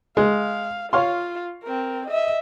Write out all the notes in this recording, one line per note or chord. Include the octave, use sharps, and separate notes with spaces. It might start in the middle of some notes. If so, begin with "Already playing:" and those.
G#3 F5
F4 C#5 F5 C6
C4 A#4
D#5 E5